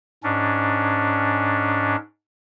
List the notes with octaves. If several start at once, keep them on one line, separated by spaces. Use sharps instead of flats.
G#2 C#4 D4